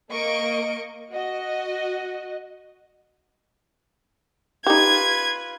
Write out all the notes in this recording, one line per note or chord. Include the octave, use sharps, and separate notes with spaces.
A#3 D#5 C#6 D7
F#4 D#5
D#4 F4 G4 B4 G#6